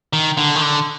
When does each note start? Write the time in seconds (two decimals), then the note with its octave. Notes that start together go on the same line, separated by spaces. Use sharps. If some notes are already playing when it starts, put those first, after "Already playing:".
0.13 D#3
0.37 D3
0.56 D#3
0.62 D3